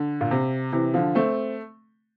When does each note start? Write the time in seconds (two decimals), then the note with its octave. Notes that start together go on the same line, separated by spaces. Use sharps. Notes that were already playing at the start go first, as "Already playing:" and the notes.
Already playing: D3
0.21 A#2
0.31 C3
0.72 C3 E3
0.94 D3 F3
1.15 A3 C4